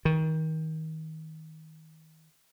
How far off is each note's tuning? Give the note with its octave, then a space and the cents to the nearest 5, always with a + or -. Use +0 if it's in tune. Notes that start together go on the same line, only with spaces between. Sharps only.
D#3 +30